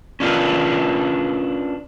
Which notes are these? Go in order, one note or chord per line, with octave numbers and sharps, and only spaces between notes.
C#4 D4 F4 G4 A#4 B4